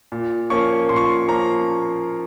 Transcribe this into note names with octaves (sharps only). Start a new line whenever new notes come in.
A#2
F3 A#3 C#4 C#6
A#2 C6
C#6
C6
F3 A#3 C#4 A#5